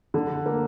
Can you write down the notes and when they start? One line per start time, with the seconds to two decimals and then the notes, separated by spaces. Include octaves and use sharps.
0.14 D3
0.46 A#3